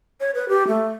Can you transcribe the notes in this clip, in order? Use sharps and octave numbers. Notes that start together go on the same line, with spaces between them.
C#5
B4
G4
A3